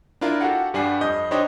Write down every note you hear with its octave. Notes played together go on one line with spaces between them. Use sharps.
D4 E4 F4 A#4
F#4 G4 A4 F5 F#5
G2 G3 D4 F#5 G#5 C7
F2 D#5 G6
D4 D#4 G4 C5 C#5 D#5